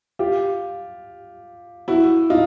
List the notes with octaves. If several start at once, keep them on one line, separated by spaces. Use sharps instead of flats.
F4 G4
E4 F#4
D#4 F4